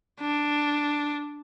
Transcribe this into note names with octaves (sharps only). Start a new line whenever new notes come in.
D4